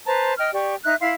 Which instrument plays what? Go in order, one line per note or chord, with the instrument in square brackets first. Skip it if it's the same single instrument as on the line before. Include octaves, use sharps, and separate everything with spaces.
[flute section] B4 C5 A5 A#5
D#5 G5 F6
G4 D5 C#6
D#4 E5 F#6
E4 F5 C6